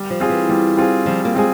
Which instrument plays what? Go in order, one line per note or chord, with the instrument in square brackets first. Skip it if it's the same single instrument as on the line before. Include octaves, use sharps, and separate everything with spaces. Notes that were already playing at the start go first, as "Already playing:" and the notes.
Already playing: [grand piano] G3
[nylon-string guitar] F3
[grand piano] C4 F4 G#4
[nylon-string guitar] E3
[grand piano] G3
C4 F4 G#4
[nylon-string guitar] F3 [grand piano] G3
[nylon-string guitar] A#3
[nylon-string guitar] G#3 [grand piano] C4 F4 G#4